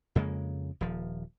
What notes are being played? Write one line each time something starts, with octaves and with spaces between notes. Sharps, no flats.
F2 C#3 G#3 A#3
D#1 F3